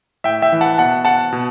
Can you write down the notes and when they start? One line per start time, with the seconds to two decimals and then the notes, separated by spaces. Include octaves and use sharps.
0.24 A2 E5 G5
0.42 E5 G5
0.52 E3
0.61 F#5 A5
0.78 B2 F#5 A5
1.05 F#5 A5
1.32 B2